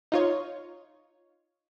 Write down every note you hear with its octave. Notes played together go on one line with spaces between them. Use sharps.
D#4 F4 C#5